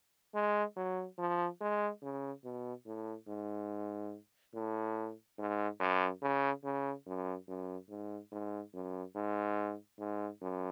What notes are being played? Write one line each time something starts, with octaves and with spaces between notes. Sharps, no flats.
G#3
F#3
F3
G#3
C#3
B2
A2
G#2
A2
G#2
F#2
C#3
C#3
F#2
F#2
G#2
G#2
F#2
G#2
G#2
F#2